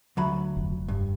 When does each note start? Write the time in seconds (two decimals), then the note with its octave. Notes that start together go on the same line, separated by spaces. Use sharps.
0.17 D2 F#3 B5
0.57 F1
0.88 G2